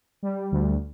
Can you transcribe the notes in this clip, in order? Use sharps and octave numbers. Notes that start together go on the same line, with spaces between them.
G3
D2